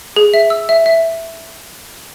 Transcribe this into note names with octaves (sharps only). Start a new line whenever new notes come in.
G#4
E5
E6
E5
E5